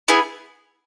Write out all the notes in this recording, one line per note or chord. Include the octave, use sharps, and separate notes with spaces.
B3 E4 G#4